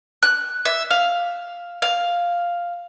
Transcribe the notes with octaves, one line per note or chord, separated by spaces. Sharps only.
F#6
E5
F5
F5